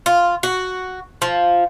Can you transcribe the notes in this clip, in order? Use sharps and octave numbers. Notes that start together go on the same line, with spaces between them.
F4
F#4
F3